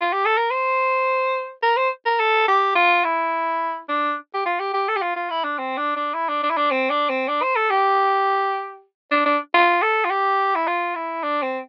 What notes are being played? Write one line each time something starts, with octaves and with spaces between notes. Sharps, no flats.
F4
G4
A4
A#4
C5
A#4
C5
A#4
A4
G4
F4
E4
D4
G4
F4
G4
G4
A4
G4
F4
F4
E4
D4
C4
D4
D4
E4
D4
D4
E4
D4
C4
D4
C4
D4
C5
A4
G4
D4
D4
F4
A4
F4
G4
E4
F4
E4
D4
C4